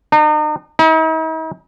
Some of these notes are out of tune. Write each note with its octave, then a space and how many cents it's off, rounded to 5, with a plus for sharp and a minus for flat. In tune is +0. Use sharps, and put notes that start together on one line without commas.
D#4 -40
D#4 +45